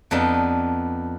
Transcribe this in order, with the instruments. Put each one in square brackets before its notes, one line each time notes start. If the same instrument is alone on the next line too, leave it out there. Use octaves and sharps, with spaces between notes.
[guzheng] F2 B3 D4 D#4